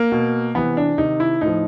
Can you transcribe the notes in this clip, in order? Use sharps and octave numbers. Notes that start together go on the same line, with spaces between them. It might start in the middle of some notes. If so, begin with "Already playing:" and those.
Already playing: A#3
B2
C3 E3 B3
D4
C3 D#3 D#4
E4
A2 F3 D#4